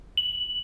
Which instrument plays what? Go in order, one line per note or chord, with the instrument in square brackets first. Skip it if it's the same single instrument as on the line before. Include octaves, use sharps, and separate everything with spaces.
[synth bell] F#7